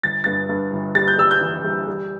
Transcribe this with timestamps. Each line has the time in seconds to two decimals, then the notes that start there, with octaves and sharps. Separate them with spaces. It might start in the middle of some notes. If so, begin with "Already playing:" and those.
0.03 G1 A6
0.24 G2 A6
0.49 G2
0.72 G1
0.95 G3 A6
1.08 G6
1.18 G3 E6
1.31 G6
1.41 E3
1.64 G3
1.87 G3